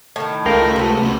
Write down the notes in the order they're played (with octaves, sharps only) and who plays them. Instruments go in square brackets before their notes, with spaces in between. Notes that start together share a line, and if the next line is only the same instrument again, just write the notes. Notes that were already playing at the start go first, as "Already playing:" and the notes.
[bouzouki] A2 D#3
[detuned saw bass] C#2 [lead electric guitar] A3 [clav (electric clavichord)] A#4 F5 G5
[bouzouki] C3 B3
[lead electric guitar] C#3 F#4